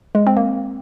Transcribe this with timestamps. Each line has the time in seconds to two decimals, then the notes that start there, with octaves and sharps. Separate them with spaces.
0.15 G#3
0.27 C4
0.37 A#3